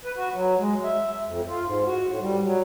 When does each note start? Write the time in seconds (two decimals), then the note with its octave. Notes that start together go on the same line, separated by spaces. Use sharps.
0.05 B4
0.17 F#4
0.34 F#3
0.59 G#3
0.84 E5
1.27 F2
1.48 F4
1.65 G#2
1.86 F#4
2.08 A2
2.20 G3
2.43 F#3